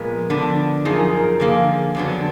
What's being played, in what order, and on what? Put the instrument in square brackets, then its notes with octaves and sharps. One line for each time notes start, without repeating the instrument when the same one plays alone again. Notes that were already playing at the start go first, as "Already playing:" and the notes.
Already playing: [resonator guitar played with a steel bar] A#2 F3 G#3 B3 [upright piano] A#4
[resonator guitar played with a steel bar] D3 F3 B3 D4
[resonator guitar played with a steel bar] F#2 F3 D#4 [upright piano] G#4
[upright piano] A#4
G#4
A#4
A#4
[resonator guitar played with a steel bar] D3 F3 A#3 [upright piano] G#4
[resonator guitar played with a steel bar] F2 D3 F#3 B3 D4